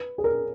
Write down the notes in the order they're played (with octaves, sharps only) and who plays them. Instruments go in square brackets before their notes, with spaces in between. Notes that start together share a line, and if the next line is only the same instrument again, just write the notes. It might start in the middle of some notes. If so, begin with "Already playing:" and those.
Already playing: [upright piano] B4
G#4
A#4